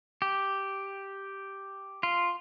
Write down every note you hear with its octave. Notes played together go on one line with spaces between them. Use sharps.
G4
F4